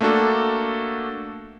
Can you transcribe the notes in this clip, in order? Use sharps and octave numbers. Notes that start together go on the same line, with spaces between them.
A3 A#3 D4 F#4 A4